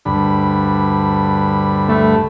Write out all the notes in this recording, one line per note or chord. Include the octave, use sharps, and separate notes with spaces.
D2 G2 B5
A3